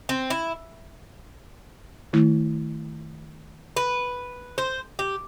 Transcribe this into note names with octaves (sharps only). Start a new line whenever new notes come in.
C4
E4
D#3 A3 E4
B4
C5
G4